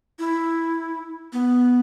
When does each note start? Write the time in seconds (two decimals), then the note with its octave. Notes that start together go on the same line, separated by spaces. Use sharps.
0.19 E4
1.33 B3